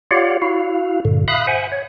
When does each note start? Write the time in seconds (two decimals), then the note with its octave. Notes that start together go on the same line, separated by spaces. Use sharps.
0.11 F4 G4 C#5 D5 F5 F#5
0.42 E4 F#4 F5
1.05 G2 A#2 D3
1.28 E5 F5 B5 D#6 F#6
1.47 C5 E5 F#5 G#5
1.72 C#5